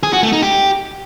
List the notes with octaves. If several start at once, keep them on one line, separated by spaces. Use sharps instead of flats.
G#4
F#4
A3
D#4
G4